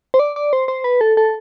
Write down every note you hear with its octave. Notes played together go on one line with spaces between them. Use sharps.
C5
D5
D5
C5
C5
B4
A4
A4